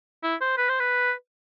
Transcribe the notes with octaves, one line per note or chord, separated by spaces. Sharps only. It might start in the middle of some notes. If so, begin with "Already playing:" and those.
E4
C5
B4
C5
B4